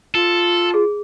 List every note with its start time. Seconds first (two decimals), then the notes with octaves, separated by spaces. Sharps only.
0.15 F4 A4
0.74 G#4